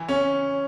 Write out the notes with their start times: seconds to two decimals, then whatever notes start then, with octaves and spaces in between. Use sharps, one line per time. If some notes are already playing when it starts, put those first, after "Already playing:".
Already playing: E3
0.09 C#4